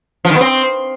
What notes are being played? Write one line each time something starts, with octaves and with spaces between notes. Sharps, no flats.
F3
D#3
B3
C4